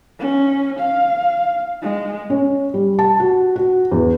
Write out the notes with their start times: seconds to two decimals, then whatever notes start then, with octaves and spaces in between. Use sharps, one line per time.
0.19 C#4
0.80 F5
1.82 G#3
2.30 C#4
2.74 G3
2.99 A5
3.20 F#4
3.56 F#4
3.91 E2